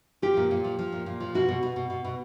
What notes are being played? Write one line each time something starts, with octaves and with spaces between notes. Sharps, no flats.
F3 G4
A#2
A#2
F3
F3
A#2
A#2
F3
B2 F#4
B2
B2
B2
B2
B2